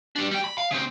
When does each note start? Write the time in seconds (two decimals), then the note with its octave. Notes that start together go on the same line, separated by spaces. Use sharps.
0.16 G3 D4
0.31 G3 G5
0.44 B5
0.58 F5
0.71 C#3 C4